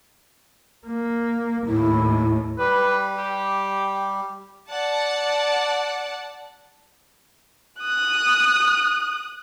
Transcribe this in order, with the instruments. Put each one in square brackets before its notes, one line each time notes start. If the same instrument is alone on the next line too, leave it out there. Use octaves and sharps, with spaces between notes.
[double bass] A#3
[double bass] D#2 A2 [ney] E4
[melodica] G3 [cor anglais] B4
[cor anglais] G4
[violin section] D5 F#5 A5
[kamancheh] D#6 F#6